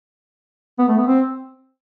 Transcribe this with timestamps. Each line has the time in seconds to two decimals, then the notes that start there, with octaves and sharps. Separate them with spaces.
0.79 B3
0.88 A3
0.98 B3
1.07 C4